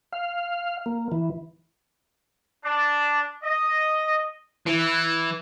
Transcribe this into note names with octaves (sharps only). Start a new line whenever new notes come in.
F5
A#3
E3
D4
D#5
E3